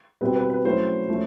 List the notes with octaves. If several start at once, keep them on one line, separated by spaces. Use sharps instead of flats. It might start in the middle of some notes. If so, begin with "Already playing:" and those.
B2 G3 C4 B4
B4
B4
F#3 A3 C#4 E4 C5
F3 A3 C#4